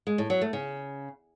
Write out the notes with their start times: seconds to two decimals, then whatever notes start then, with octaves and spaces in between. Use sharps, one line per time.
0.07 G#3
0.18 A2
0.30 F#3
0.41 A3
0.53 C#3